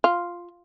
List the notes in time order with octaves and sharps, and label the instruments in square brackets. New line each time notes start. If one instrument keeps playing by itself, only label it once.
[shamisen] F4